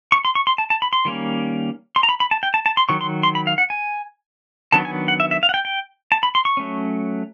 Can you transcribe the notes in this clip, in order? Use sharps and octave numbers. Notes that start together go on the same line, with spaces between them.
C#6
C6
C#6
C6
A5
A5
B5
C6
D#3 G3 A#3 C#4
C6
A#5
B5
B5
A5
G5
A5
A5
C6
D#3 F#3 C#6
C6
C6
B5
F5
F#5
G#5
D#3 F#3 B3 D4 A5
G#5
F#5
E5
E5
F5
F#5
G5
G5
A5
B5
C6
C#6
F#3 A3 C#4